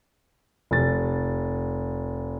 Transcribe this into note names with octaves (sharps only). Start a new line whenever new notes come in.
F1 A6